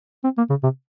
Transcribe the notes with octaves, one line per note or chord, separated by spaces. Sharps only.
C4
A#3
C#3
C3